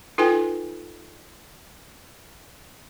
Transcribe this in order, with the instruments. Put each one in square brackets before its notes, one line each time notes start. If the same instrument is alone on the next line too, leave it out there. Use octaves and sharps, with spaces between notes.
[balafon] D#4 F4 A4 B4 G5 G#5